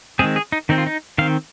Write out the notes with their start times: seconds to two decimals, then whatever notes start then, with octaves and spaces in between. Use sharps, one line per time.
0.19 D#3 G#3 C4 G#4
0.36 G#4
0.52 D#4
0.69 D#3 C4 D#4
0.78 F4
0.87 D#4
1.18 D#3 C4 F5